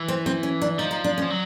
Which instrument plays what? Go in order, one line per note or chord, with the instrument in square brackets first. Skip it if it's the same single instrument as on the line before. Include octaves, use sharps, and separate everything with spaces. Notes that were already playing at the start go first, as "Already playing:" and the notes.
Already playing: [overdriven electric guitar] E3
[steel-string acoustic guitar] C4
C4
C#4
D4
[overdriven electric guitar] F3 [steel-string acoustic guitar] D#4
[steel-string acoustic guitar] D#4
D4
C#4
[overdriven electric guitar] F3
F#3